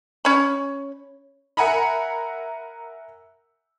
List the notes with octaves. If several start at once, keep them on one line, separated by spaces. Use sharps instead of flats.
C#4 B5
A#4 E5 F#5 G#5 A#5 B5